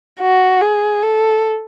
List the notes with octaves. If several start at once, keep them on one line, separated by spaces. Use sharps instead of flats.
F#4
G#4
A4